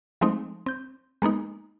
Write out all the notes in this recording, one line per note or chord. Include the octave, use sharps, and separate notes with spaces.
F3 G#3 A3 C4 D#4
C4 G6
G#3 A#3 B3 D#4